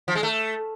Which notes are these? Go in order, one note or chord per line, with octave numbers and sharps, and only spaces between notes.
F3
G#3
A3